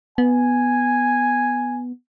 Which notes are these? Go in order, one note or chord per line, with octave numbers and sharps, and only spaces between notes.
B3 G#5